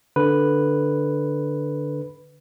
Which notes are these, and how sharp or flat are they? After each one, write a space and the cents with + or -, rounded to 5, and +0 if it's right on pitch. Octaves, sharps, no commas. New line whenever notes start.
D3 +0 B4 +0